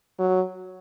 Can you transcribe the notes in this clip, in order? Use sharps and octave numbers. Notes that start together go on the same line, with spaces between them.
F#3